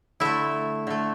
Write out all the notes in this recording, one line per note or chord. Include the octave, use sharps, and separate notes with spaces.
D3 A3 E4 E5
D3 A3